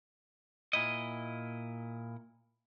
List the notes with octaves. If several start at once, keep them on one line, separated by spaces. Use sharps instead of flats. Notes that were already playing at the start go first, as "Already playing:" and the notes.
A#2 E4 D#5